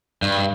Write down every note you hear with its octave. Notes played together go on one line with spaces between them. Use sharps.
G2